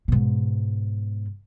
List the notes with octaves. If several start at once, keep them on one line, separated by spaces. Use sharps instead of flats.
G#2 B2